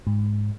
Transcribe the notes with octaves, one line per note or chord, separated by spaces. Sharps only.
G#2